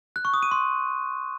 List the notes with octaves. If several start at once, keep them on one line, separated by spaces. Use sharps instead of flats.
F#6
C#6
D#6
D#7
C6